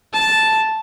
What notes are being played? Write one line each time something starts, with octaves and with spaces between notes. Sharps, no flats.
A5